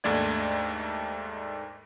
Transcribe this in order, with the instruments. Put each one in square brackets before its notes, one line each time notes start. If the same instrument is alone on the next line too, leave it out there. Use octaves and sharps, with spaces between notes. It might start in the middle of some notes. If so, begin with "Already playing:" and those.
[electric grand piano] D#2 G#2 A3 D4 D5 G#6